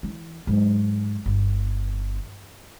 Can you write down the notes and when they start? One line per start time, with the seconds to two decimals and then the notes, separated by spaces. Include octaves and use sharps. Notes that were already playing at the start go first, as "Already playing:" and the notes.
0.03 E3
0.47 G#2 F#3
1.26 G1